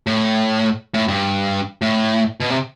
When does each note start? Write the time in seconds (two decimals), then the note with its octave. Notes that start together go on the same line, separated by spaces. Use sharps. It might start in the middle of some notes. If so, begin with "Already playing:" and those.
0.07 A2
0.94 A2
1.08 G2
1.82 A2
2.40 B2
2.50 C3